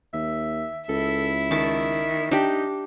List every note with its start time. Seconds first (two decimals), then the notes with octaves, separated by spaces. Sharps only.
0.13 D#2 E5
0.89 C#2 E4 A4 E5
1.51 D#3 A5 C#6
2.31 D4 D#4 G4